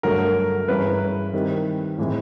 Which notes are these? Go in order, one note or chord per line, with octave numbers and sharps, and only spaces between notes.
G2 D3 F#3 A3 A#4
G2 E3 G#3 C#4 E4 B4
D#3 G3 C4 E4
A2 E3 G#3 C4 E4